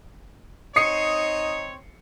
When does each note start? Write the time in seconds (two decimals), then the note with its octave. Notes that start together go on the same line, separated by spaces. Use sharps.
0.76 C4 D#4 C#5 D#6 C7 C#7